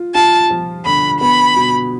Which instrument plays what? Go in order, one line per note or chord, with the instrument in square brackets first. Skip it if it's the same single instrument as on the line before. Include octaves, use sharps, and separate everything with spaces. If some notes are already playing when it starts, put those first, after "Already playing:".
Already playing: [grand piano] F4
[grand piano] F4 [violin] A5
[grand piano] F3
[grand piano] D3 [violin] B5
[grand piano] B3 [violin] B5
[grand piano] B2